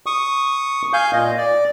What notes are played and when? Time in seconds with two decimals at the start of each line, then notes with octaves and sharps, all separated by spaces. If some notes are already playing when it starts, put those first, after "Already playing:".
0.06 C#6 D#6
0.93 F5 G#5 G6
1.13 A#2 D#5
1.37 D5